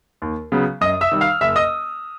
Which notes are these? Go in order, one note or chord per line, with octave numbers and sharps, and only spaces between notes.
D#2
C#3 F#3 B3
F#2 D#5 D#6
E5 E6
D#3 G3
F5 F6
F#1 E5 E6
D#5 D#6